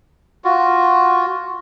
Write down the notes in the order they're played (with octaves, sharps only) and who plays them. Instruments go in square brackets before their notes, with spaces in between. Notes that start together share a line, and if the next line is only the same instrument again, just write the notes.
[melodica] F4 F#4